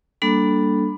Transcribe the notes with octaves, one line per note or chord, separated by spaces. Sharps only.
G3 A#3 D4 A4 B5